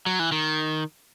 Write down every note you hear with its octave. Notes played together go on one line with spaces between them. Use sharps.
F#3
E3
D#3